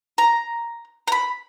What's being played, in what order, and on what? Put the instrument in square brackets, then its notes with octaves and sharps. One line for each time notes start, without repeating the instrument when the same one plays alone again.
[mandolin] A#5
A#5
B5